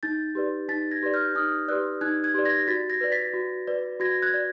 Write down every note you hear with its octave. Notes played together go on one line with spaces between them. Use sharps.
D#4 G6 A6
G4 B4 D5
D#4 A6 B6
G#6 A#6
G4 B4 D5
F6 G6
D#4 D#6 F6
G4 B4 D5 E6 F#6
D#4 F#6 G#6
F#6 G#6
G4 B4 D5
G#6 A#6
F#4 A6 B6
G#6 A#6
B4 D5
A6 B6
F#4
B4 D5
F#4 G#6 A#6
F#6 G#6
D5